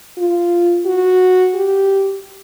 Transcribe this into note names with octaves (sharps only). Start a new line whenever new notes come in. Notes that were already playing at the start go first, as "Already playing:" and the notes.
F4
F#4
G4